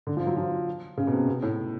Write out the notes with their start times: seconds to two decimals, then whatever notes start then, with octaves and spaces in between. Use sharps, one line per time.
0.07 D3
0.17 F3
0.27 F#3
0.37 F3
0.97 C#3
1.07 B2
1.13 C3
1.28 B2
1.42 A2